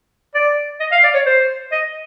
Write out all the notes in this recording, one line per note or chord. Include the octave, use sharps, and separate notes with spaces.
D5
D#5
F5
D5
C#5
C5
D#5